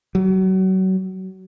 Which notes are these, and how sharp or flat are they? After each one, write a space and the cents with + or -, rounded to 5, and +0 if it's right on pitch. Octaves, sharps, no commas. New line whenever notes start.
F#3 +30